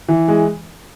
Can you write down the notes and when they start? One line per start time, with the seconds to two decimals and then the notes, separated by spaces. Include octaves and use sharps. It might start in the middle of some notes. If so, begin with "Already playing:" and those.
0.08 E3
0.28 G#3